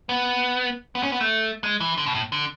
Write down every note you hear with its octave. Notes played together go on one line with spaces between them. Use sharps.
B3
B3
C#4
B3
A3
G#3
E3
D3
B2
A2
D3